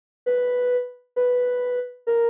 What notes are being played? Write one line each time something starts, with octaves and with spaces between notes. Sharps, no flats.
B4
B4
A#4